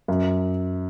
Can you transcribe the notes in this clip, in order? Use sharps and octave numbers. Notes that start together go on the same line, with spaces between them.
F#2